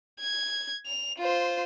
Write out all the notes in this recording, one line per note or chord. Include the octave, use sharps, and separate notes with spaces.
G#6
F7
F4 C5